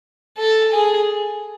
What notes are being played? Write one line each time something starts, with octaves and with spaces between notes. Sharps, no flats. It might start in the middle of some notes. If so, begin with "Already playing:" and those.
A4
G#4